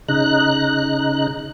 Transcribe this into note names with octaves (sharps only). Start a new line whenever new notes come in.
C#3 D#4 F#6